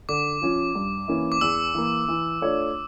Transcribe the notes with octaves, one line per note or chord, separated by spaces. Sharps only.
D3 D6
F3 C#4 F4
G2
E3 A#3 C#4 E4
D6
E2 E6
E3 A#3
E3
A3 D4 F4 C#5